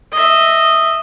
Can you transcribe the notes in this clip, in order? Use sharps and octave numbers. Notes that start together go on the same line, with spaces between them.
D#5 E5